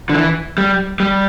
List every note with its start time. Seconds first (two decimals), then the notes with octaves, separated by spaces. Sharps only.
0.10 D3
0.14 E3
0.58 G3
1.00 G3